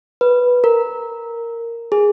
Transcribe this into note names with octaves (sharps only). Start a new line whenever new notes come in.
B4
A#4
G#4